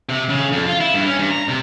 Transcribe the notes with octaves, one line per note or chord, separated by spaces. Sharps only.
C3
C#3
F2
F4
E4
G2
C#4
G2
A#5
C3